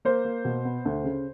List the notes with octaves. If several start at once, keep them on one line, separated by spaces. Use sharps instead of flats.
A#3 C5
A#3
B2
B3
D2
C#3